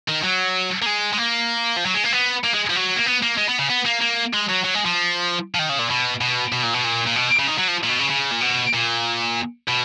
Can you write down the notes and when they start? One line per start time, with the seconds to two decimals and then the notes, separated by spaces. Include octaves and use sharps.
0.09 D#3
0.24 F#3
0.82 A#3
0.86 G#3
1.13 G#3
1.18 A#3
1.77 F3
1.85 F#3
1.94 G#3
2.04 A#3
2.12 B3
2.44 A#3
2.54 G#3
2.70 F3
2.76 F#3
2.96 A#3
3.06 B3
3.23 A#3
3.38 G#3
3.49 B3
3.59 C#3
3.70 B3
3.85 A#3
4.01 A#3
4.33 G#3
4.49 F#3
4.64 F#3
4.74 G#3
4.85 F3
5.55 F3
5.59 D#3
5.69 C#3
5.79 A#2
5.90 B2
6.21 B2
6.52 B2
6.63 A#2
6.74 B2
6.84 A#2
7.07 A#2
7.16 B2
7.39 C#3
7.47 D#3
7.58 F#3
7.68 F3
7.84 A#2
7.89 B2
8.00 C#3
8.10 C#3
8.32 A#2
8.41 B2
8.74 A#2
9.68 B2